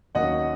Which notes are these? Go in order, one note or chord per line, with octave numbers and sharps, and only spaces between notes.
D#2 D#3 F#3 A#3 C#4 D#5 F#5